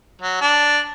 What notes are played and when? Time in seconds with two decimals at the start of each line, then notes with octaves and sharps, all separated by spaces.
0.22 F#3
0.41 D4